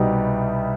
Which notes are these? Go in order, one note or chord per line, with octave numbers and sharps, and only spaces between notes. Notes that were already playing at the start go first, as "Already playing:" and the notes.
Already playing: C2 B2 G3 D#4